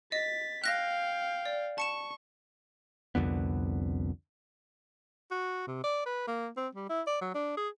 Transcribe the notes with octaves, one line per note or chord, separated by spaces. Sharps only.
D#5 A6 B6
F5 G5 F#6 A#6
D5
A5 C#6 C#7 E7
C2 F2 D3 B3
F#4
C3
D5
B4
A#3
C4
G3
E4
D5
F#3
D4
G#4